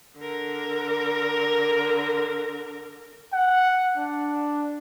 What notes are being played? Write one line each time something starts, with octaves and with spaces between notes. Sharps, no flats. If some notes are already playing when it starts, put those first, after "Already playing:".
D3 A#4
F#5
D4